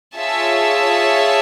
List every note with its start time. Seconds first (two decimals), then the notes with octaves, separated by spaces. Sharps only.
0.15 F4 G#4 C#5 E5 A5